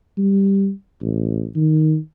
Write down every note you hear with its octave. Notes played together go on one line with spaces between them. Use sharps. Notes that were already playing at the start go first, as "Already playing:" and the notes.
G3
A1
D#3